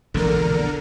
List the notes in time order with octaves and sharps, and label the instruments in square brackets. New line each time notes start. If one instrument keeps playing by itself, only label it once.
[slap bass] E1 A#1 E2 [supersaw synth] D3 A#4